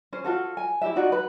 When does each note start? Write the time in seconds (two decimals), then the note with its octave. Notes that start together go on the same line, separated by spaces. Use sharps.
0.13 C#4 C5
0.24 F4 F#4 A4
0.57 G#5
0.81 E4 G4 E5
0.96 D#4 F4 F#4 D5
1.12 B4